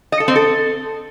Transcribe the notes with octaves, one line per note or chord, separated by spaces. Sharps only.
D#5
A4
C4
A4